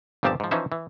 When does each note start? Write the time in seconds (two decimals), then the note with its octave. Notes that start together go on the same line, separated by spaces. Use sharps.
0.23 G1 A#2 F3 C4 G4 A5
0.40 G#2 F3
0.51 E3 F3 C#4 D#4 C5 E5
0.72 E3